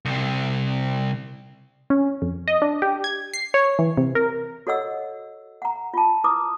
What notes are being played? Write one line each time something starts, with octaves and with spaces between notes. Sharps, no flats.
C2 C3
C#4
F2
D#5
D4
G4
G#6
C7
C#5
E3
C3
A#4
F#4 A4 C#5 D#5 F#5 E6
F#5 A#5
F4 A5
E4 B4 A#5 D6 D#6